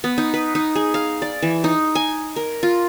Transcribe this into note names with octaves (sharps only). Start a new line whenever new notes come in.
B3
D#4
B4
D#4
G#4
F5
D5
E3
D#4
G#5
A#4
F4